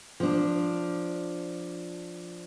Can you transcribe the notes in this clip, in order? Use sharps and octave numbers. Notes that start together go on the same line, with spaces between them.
F3 D4